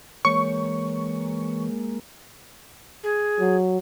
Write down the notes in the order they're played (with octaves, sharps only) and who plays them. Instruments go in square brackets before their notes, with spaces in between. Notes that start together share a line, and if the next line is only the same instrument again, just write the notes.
[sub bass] E3 [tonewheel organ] G#3 A#3 [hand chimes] C#5 [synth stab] C#6
[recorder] G#4
[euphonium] F#3